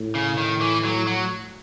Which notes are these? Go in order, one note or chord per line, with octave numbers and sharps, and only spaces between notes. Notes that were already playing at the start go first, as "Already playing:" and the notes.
Already playing: A2
C#3
D#3
E3
F#3
F#3